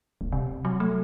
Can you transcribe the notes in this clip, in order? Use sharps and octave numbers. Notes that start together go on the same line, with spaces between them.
D1
C3
F#3
A3